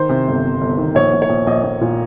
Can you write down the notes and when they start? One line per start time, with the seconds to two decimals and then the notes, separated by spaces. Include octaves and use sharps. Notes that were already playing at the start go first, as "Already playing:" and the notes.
Already playing: D#3 C5
0.09 C3
0.27 G1
0.44 G1
0.61 G1
0.78 D#3
0.95 A#1 C#5
1.13 A#1
1.22 C#5
1.30 A#1
1.47 A#1 D#5
1.64 A#1
1.81 A#2